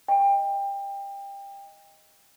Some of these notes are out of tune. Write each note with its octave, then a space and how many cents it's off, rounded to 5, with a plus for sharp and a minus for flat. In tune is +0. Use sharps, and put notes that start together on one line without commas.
D#5 +0 G5 +25